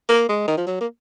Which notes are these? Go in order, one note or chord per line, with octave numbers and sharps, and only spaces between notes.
A#3
G#3
D#3
F3
F#3
A#3